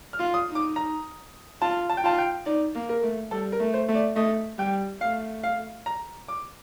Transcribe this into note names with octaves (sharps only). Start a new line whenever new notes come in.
F6
F4
D#6
D#4
D6
A#5
F4 A5
A5
G5
F4 A5
G5
D#4 D5
A#3
A#4
A3
G3 A4
A#4
A3
C5
A3
D5
A3 D#5
G3 G5
A3 F5
F5
A#5
D6